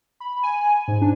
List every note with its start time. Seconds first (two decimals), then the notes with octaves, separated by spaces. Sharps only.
0.20 B5
0.43 G#5
0.88 G#2
1.02 D4